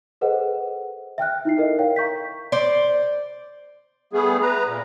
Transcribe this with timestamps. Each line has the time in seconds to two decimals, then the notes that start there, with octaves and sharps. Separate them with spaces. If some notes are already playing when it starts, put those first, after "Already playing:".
0.21 G#4 A4 B4 C5 D#5 F#5
1.18 E5 G5 F6 F#6
1.45 D#4 E4 C7
1.57 A4 A#4 D#5 E5
1.79 C#5 F5 G5
1.96 A#5 C#6 G6 B6
2.52 C5 D5
4.13 G3 A3 B3 G#4
4.41 B4 A#5
4.66 A#2